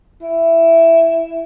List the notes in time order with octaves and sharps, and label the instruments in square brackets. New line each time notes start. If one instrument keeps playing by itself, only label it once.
[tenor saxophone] E4